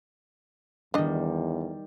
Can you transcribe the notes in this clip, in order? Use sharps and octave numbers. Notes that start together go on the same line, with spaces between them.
E2 D#3 G3 D4 D#5